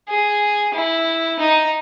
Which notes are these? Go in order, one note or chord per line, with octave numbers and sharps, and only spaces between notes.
G#4
E4
D#4